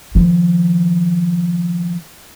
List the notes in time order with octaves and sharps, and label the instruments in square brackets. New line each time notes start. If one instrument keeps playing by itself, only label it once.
[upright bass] D#3 F3